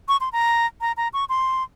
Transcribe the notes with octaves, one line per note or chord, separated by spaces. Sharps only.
C#6
C6
A#5
A#5
A#5
C#6
C6